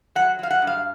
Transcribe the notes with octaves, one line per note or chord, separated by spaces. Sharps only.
F#3 F#5
F#3 F5
F#5
G2
F5